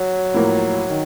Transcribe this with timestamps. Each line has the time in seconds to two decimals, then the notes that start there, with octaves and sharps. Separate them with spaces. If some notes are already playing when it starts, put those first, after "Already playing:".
Already playing: F#3
0.34 A2 F3 A#3
0.90 D#3